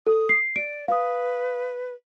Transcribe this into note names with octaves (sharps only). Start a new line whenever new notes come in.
A4 D#6
C7
D5 D7
B4 F5 D#6